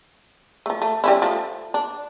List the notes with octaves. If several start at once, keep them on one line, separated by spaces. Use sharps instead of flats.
F3 A3
A3
G3 C#4 E4
F3 A3
D4